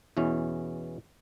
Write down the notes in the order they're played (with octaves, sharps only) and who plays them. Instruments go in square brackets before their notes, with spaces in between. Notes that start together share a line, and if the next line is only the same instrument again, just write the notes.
[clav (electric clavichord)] E2 B2 E3 C#4